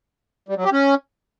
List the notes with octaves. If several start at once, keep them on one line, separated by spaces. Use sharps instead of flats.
G3
F#3
G4
C#4